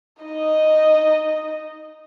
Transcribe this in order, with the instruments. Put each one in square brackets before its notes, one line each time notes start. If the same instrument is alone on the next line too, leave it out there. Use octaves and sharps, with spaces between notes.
[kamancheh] D#4 D#5